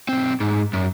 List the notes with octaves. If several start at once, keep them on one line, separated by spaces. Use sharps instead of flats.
B1 C4
G#2
F#2